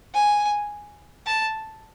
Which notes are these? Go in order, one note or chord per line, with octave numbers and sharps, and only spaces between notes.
G#5
A5